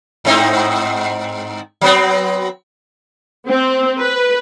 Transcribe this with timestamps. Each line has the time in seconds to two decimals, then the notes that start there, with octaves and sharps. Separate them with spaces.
0.25 G#2 C4 D#4
1.81 F#3 B3 C4
3.48 C4
4.00 B4